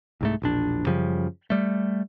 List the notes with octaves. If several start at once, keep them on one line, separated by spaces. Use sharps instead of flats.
C2 G#2 A3
E1 A#1 D4
F#2 C#3 F3 G3
G3 A3